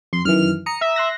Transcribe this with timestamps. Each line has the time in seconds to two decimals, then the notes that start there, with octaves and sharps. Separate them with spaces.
0.13 F2 C6
0.25 F#2 D#3 E3 F6
0.66 A#5 D#6 C#7
0.81 E5
0.96 C6 F#6 A#6